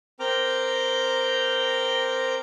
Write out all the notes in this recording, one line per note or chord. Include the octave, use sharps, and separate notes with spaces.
C4 A#4 G5 A#5 D6 F6